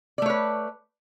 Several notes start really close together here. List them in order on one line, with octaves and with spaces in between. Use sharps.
D5 A3 C#5 B4